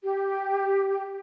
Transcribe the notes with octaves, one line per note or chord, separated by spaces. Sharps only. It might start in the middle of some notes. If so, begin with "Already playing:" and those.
G4